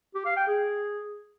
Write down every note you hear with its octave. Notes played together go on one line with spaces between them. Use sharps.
G4
F5
G5
G#4